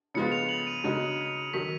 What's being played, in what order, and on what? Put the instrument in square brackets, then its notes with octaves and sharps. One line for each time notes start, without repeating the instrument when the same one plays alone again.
[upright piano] C#3 F3 G#3 B3 F4 [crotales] C#7
[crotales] F7
F#7
D#7
[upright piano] C#3 G#3 D#4 F#4
[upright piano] D#3 F#3 [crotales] B6